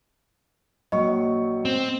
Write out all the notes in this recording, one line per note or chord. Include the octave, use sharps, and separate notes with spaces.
A#1 F#3 D#5 C#6
C4